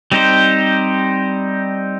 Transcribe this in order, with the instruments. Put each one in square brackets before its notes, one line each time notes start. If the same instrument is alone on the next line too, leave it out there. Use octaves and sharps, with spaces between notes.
[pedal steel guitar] G3 C4 D#4 G4 C5